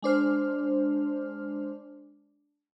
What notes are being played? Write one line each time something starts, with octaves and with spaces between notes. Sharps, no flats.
G#3 D4 C5 F6